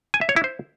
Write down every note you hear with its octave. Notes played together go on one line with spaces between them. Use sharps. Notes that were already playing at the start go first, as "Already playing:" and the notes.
G#5
E5
C#5
E4
C5